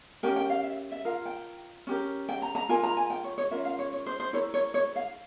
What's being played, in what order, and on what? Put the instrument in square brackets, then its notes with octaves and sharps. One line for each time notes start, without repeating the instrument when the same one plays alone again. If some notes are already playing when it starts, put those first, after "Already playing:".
[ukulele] C#4 G4 A#4 G5
G5
F5
E5
E5
F4 A#4 F5
G5
C#4 G4 A#4
G5
A#5
A#5
F4 A#4 G#5
A#5
G#5
G5
C#5
C#5
C#4 F4 A#4 E5
F5
C#5
C#5
C5
C5
E4 A#4 C#5
C#5
C#5
F5